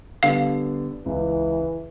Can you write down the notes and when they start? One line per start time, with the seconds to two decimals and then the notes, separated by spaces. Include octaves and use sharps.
0.23 D3 G3 B3 F5
1.06 C#2 E3